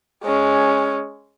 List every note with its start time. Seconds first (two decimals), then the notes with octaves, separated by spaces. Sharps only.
0.24 G#3 C#4